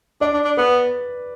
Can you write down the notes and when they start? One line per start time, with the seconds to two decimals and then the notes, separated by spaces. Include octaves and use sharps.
0.21 D4 D5
0.33 D4
0.44 D4
0.57 B3 B4